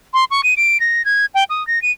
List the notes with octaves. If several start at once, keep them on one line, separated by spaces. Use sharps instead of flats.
C6
C#6
D#7
D7
A#6
G#6
G5
D#6
A#6
D#7